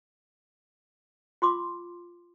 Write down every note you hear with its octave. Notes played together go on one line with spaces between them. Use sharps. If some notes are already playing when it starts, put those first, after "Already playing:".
F4 C6 D6